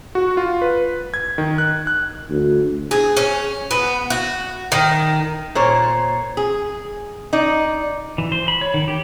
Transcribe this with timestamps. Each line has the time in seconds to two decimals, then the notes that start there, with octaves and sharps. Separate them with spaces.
0.15 F#4
0.37 F4
0.62 B4
1.14 G#6
1.38 D#3
1.58 F#6
1.87 F#6
2.30 D2
2.91 G#4
3.17 C#4
3.71 B3
4.10 F#4
4.72 D#3
5.55 A#2 C5 C#5
6.37 G#4
7.33 D#4 D5
8.18 E3
8.32 C5
8.48 B5
8.61 C#5
8.74 D#3
8.88 G4